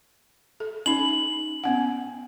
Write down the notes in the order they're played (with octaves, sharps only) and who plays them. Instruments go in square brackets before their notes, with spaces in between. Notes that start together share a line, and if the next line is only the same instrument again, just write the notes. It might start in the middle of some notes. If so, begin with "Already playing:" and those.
[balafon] A4
[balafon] C#4 D#4 [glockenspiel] F#7
[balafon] B3 C#4 F#5